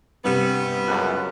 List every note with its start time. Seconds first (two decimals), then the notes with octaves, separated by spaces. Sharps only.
0.24 G2 C3 G3 B3 C4
0.88 C#2 F#2 F#6